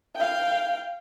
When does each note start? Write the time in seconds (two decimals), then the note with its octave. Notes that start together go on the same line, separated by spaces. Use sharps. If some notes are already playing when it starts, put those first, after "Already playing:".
0.16 F5 G5